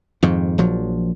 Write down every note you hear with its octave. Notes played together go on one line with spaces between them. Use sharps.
F2 G#2 D#3
A#1 F3 F#3